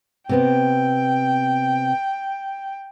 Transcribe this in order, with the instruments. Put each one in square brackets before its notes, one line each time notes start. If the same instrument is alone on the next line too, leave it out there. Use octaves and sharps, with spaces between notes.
[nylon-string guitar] C3 B3 C4 [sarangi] G5